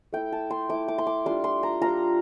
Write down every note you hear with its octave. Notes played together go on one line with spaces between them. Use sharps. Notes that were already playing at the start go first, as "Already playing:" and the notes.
A3 E4 G5
A5
C6
A3 E4 D6
D6
C6
D6
G3 D4 F4 C6
C6
A#5
G3 D4 F4 A#5